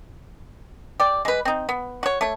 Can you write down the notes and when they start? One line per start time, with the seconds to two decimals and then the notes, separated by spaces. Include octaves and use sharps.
1.00 G4 D5
1.25 G#3 B4
1.45 C4 D#4
1.69 B3
2.03 F#4 C#5
2.21 A3 C#5